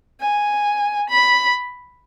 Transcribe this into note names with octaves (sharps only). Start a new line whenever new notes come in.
G#5
B5